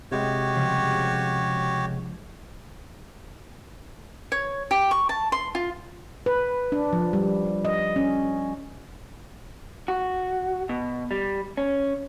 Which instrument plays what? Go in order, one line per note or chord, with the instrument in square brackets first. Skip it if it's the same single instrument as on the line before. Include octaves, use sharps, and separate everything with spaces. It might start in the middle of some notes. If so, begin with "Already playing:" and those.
[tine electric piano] C3 G#3 [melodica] F#4 G4 C#5
[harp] C#3 F3 G3
[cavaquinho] C#5
G4
C#6
A5
C6
F4
[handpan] B4
D4
F3
G3
D#5
C#4
[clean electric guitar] F#4
B2
G3
C#4